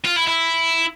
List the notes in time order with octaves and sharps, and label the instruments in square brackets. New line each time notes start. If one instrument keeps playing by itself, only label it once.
[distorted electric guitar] F4
E4
E4